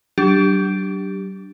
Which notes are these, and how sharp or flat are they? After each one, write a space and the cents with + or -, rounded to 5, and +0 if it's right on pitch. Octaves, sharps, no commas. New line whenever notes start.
F#3 +45 D4 +0 G4 +0